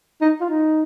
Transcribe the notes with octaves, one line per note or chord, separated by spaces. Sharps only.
D#4
F4
D#4